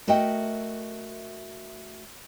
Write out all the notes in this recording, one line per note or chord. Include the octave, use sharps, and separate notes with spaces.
A3 F#4 A#4 D#5 E5 G5